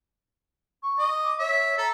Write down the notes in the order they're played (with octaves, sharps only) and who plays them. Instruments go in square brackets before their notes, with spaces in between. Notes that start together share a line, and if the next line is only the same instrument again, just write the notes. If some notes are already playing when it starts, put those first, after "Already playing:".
[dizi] C#6
[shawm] D#5
[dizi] D6
[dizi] C#5 [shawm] E5
[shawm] A4 [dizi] A#5